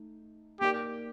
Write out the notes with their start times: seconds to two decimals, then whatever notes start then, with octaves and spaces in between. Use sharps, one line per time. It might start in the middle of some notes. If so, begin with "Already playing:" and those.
Already playing: A3 D#4
0.60 A#3 D#4 G4 A#4 D5